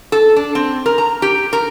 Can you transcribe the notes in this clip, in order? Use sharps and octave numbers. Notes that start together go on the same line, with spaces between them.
A4
D4
C4
A#4
A#5
G4
A#4